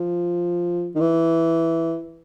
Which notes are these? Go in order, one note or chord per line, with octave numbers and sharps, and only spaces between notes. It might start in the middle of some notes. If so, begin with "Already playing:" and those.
Already playing: F3
D#3
E3